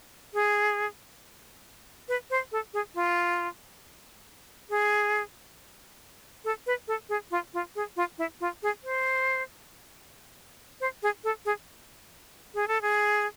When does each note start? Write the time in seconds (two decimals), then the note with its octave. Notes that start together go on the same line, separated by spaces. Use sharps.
0.34 G#4
2.08 B4
2.30 C5
2.52 A4
2.74 G#4
2.95 F4
4.70 G#4
6.44 A4
6.66 B4
6.88 A4
7.09 G#4
7.31 F4
7.54 F4
7.75 G#4
7.96 F4
8.18 E4
8.40 F4
8.63 G#4
8.84 C5
10.80 C5
11.03 G#4
11.24 A4
11.45 G#4
12.54 G#4
12.68 A4
12.82 G#4